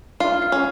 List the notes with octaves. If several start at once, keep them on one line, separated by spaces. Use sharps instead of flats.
F4 F5
F5
C#4